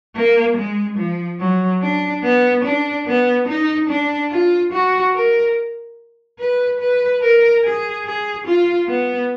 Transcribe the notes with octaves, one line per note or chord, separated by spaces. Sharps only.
A#3
G#3
F3
F#3
D4
B3
D4
B3
D#4
D4
F4
F#4
A#4
B4
B4
A#4
G#4
G#4
F4
B3